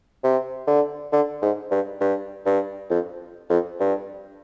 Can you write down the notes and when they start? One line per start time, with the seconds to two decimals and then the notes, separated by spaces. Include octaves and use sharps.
0.24 C3
0.67 D3
1.12 D3
1.42 G#2
1.71 G2
2.01 G2
2.46 G2
2.90 F2
3.50 F2
3.80 G2